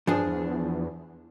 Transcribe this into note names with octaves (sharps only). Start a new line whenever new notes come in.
G2 F3 D4 G#4
E2